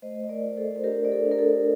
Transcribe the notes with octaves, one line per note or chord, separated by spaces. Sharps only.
A3 C5 D#5
D#5
A#4 D5
F4
A4 C5
C5
D4 G4 A#4
D5
A4 C5
D4
A#4
A4